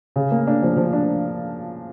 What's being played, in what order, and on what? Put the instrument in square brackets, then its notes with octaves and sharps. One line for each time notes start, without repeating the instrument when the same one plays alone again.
[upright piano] C#3
A#3
D4
F3
F3
D4